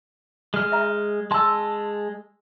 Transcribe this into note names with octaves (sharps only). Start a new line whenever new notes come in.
G#3 F6
E5 A#5
G#3 A5 C6 E6